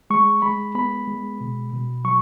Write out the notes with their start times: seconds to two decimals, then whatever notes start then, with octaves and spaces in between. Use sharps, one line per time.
0.10 G#3 C#6
0.42 G#3 B5
0.75 B3 B5
1.08 G#3
1.41 B2
1.73 B2
2.05 F#3 C#6